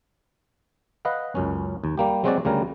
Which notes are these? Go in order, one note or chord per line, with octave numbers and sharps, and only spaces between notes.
B4 D#5 F5 F#5
C#2 F#2 C#4
D#2
G3 A#3 G4
F#3 G#3 C4 F#4 G4 D5
D2 C#3 G3 A#4